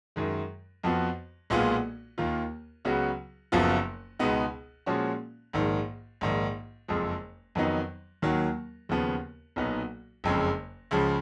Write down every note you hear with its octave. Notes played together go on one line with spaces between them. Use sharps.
F#2 D#3 G#3
F2 F3 B3 F#4
B1 A#2 G#3 B3 F4
D#2 D#3 A#3 F4
C#2 C#3 F#3 B3 F#4
F#1 F#2 F3 B3 F4
C#2 B2 G#3 B3 D#4
A#2 F3 G#3 C#4 F#4
A#1 G#2 D#3
A#1 G#2 D#3
F#1 F2 F3 G#3
F2 D#3 F#3 B3 D#4
D#2 D#3 F#3
D#2 C#3 F3 B3
B1 A#2 F#3 B3 D#4
F#1 F2 C#3 G#3
C#2 C#3 F3